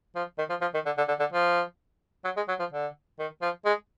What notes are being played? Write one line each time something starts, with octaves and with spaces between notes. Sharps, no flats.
F3
D#3
F3
F3
D#3
D3
D3
D3
D3
F3
F#3
G#3
F#3
F3
D3
D#3
F3
G#3